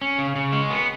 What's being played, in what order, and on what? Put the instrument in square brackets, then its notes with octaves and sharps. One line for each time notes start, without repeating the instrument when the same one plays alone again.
[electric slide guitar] C#4
C#3
C#3
G#3
B3